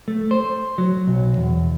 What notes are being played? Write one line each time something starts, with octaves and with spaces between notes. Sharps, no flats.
A3
C5
F#3
B1
E2